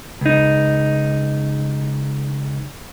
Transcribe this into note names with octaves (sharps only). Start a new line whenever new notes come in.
C#2 D#4